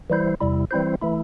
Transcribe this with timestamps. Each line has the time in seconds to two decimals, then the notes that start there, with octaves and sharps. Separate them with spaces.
0.10 E3 G3 E4 C5
0.40 E2 C3 G3 E4
0.71 E3 G3 C4 E4 C5
1.02 E3 A3 E4